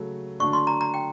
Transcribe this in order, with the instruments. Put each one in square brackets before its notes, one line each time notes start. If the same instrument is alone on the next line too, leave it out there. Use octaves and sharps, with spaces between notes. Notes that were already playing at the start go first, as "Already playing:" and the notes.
Already playing: [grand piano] C#3 F#3 A3
[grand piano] D3 F#3 A3 D4 [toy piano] C#6
[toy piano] C6
A#5
A#5
G5